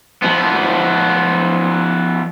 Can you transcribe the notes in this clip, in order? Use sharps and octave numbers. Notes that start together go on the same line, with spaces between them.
F3 B3